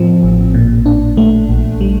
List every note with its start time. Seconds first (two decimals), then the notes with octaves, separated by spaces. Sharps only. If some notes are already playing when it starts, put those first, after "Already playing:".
Already playing: A2 F3 C4
0.23 A1
0.54 A#2
0.86 D4
1.17 A3
1.49 A#1
1.81 G3